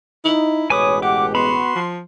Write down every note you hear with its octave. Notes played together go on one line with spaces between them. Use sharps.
D#4 E4
A1 B2 G#3 B4 C#5 G#5 D6 D#6
G4 F#5 D6
B3 F#4 B5 C6
F3